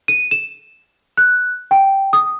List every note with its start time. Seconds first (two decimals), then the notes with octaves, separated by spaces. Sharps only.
0.08 D#7
0.31 E7
1.17 F#6
1.71 G5
2.13 D#6